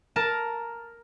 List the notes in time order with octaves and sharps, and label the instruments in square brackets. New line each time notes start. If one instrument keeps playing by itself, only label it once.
[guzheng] A#4 A5